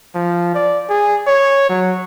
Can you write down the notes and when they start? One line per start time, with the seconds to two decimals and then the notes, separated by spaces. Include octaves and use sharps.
0.15 F3
0.55 D5
0.89 G#4
1.27 C#5
1.69 F#3